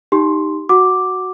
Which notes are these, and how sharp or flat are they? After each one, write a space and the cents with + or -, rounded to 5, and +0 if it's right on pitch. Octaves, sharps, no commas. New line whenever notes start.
D#4 +0 G4 +0 C6 +0
F#4 +0 F#5 +0 D6 +0